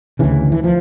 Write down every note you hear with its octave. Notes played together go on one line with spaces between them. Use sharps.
D2 C#3 E3
E3
F3